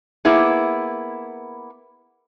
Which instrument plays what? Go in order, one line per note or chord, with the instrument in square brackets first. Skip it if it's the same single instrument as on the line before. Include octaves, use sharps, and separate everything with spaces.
[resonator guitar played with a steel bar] A#3 B3 E4 G#4